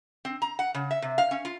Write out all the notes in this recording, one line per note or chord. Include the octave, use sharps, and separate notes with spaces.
C4
A#5
F#5
C#3
E5
C3
F5
C#4
F4